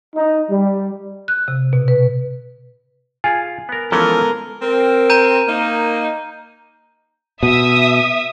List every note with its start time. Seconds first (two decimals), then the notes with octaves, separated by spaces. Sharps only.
0.16 D#4
0.50 G3
1.28 F#6
1.48 C3
1.73 B2
1.88 B4
3.24 F4 G#4 G#5
3.69 B3 A#4
3.92 E3 F3 G#3 B3 C#4 A4 A#4
4.62 C4 A#4
5.10 A#5 G6 D#7
5.48 A#3 D#4
7.43 B2 E5 D#6